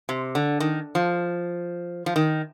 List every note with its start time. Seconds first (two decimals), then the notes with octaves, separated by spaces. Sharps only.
0.09 C3
0.35 D3
0.60 D#3
0.95 F3
2.06 F3
2.16 D#3